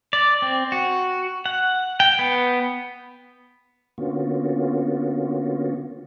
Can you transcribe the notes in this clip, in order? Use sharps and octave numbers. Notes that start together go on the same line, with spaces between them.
D5
C4
F#4
F#5
G5
B3
D3 A#3 B3 C#4 F4 F#4